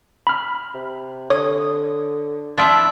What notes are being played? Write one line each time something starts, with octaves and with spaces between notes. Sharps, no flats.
B5 F6
C3
D3 C#5 D#6
F3 D4 E4 F4 E5 A5